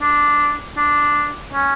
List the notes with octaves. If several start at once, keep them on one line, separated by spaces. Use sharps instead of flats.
D4
D4
C#4